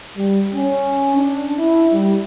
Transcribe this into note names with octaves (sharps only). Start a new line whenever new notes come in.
G3
C#4
D4
E4
G3